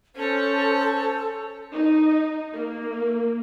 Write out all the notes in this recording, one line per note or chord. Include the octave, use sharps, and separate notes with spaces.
C#4 A4 C5 C#5
D#4
A#3